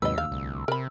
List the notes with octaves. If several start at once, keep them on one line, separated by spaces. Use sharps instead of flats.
D#2 G#2 C3 F#3 B4 D#5 E6
D2 F5
C2
C3 A#4 B5